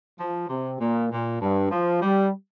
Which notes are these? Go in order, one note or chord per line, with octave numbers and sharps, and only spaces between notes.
F3
C3
A#2
A#2
G2
F3
G3